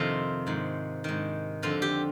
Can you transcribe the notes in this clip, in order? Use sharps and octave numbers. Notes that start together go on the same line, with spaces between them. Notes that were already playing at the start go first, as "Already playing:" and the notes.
Already playing: F2 C3 D#3 F4
G#2 D#3
G#2 D#3
F2 D3 F3 F4
G4